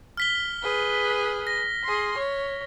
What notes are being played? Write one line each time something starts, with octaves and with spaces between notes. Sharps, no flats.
F6 B6 G7
G#4 B4
A#6
G#4 C6
C#5